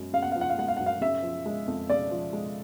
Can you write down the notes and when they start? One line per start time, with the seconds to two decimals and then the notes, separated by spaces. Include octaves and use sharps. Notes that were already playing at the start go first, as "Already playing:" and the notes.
Already playing: F#2 G#3
0.13 C#3 F5
0.22 F#5
0.32 F3 F5
0.41 F#5
0.49 F5
0.58 G#3 F#5
0.68 F5
0.77 F#2 F#5
0.86 F5
1.01 C#3 E5
1.23 F3
1.46 G#3
1.67 F2
1.90 C#3 D5
2.11 F3
2.33 G#3